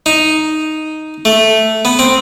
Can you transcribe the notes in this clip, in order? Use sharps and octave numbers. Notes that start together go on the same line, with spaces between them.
D#4
A3
B3
C4